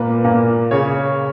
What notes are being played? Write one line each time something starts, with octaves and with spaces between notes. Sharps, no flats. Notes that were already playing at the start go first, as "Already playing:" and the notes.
Already playing: A#2 A#3 B4
A#2 A#3
C#3 C#5